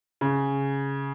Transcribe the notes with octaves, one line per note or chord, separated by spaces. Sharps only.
C#3